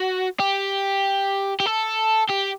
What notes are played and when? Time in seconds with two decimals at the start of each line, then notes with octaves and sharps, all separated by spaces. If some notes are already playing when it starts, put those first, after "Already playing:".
Already playing: F#4
0.40 G4
1.60 G4
1.66 A4
2.29 G4